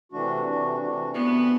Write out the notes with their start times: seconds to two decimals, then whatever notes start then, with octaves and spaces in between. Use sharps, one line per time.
0.12 C3 E3 A3 D4 F#4
0.46 C3 E3 A3 D4 F#4
0.80 C3 E3 A3 D4 F#4
1.14 C3 E3 A3 B3 D4 F#4